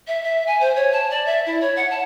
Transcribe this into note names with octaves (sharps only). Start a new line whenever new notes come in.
E5
E5
G#5
C5
C#5
A5
D5
E5
E4
C#5
F#5
A5